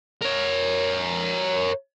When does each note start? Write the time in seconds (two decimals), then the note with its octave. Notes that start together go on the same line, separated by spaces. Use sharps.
0.21 A#4 C#5